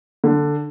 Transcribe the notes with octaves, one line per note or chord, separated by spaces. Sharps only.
D3